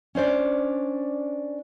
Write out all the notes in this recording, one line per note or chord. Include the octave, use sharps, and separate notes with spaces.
C#4 D4 C5 D5